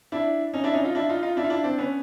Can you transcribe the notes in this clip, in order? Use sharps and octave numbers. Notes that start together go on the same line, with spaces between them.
D4 E4
C#4 D#4
D4 E4
C#4 D#4
D#4 F4
D4 E4
D#4 F4
D#4 F4
D4 E4
F4
D4 E4
C4 D4
B3 C#4